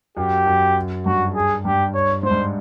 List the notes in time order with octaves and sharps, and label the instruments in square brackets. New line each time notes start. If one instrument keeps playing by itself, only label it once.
[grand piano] F#2 [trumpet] G4
[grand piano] F#2
[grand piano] G2 [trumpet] F#4
[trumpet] G#4
[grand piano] G2 [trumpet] G4
[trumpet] C#5
[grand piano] G#2 [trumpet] C5
[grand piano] G2